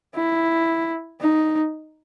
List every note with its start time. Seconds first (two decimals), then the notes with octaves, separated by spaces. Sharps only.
0.15 E4
1.21 D#4